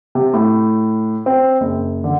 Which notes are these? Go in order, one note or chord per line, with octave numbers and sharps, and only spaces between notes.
C3
A2
C4
F#1
D3